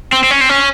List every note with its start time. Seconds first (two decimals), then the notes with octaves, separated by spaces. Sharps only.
0.12 C4
0.23 C4
0.31 C#4
0.41 C4
0.49 C#4